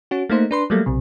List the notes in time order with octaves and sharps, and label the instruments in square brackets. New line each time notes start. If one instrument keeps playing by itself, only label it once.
[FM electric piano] C#4 F#4
A3 A#3 D#4 C5
D4 B4 C6
F#3 G3 A3 A#3
B1 C3